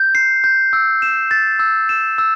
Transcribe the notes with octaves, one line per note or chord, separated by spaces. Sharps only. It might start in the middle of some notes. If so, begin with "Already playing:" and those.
Already playing: G6
C7
G6
E6
E7
A6
E6
E7
E6